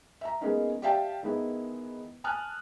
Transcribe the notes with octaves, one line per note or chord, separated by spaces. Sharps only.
E5 A#5
G#3 A#3 B3 C#4 D#4
G4 D5 E5 F5 G5 A5
D#3 G#3 B3 E4
G#5 A5 D#6 F6 F#6